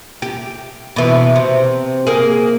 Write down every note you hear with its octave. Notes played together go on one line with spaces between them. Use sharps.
G4
B2 E3
C3
A#3 G#4